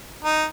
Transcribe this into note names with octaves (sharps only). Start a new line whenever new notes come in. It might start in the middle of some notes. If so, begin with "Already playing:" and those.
D#4